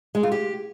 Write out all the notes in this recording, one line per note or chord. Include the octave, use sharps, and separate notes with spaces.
G#3
F4
G4